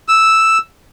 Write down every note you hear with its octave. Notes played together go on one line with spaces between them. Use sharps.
E6